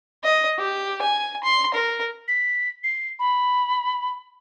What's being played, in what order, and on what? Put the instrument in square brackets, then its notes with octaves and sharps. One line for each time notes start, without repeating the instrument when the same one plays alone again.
[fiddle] D#5
G4
G#5
C6
A#4
[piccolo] B6
C7
B5